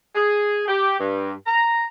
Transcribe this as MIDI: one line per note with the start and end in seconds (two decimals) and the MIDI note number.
0.15 0.63 68
0.67 0.97 67
0.99 1.32 43
1.46 1.87 82